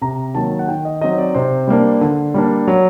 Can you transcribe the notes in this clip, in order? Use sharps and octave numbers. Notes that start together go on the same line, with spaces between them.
C3 A#5
D#3 F#3 A#3 A5
F#5
D#3 G5
D#5
F#3 C4 D#4 D#5
D5
C3 C5
G3 A#3 D4
D3
G3 A#3 D4
F#3